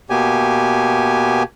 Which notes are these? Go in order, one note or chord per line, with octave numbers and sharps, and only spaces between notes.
B2 A#3 B3 G4 G#5